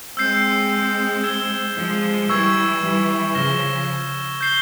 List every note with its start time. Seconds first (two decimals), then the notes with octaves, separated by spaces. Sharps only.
0.17 G#3 C4 E6 G6 C7
1.23 E6 G#6 E7 G7
1.76 F3 G#3
2.29 E3 G3 C#6 E6 G#6
2.82 E3 G3
3.35 C#3 F3 F6 A#6 E7 G7
4.41 G6 C7 G7